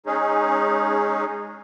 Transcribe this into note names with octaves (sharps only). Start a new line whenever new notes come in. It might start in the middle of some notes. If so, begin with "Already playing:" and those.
G#3 C#4 D#4 G#4